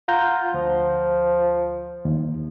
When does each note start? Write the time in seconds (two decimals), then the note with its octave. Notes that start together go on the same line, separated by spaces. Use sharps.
0.08 F4 F#5 A#5 G6
0.54 D2 F3
2.05 D#2